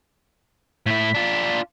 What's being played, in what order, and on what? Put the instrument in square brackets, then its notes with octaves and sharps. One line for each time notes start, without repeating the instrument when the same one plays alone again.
[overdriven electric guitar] A2 E4 [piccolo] B6
[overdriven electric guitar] D4 F4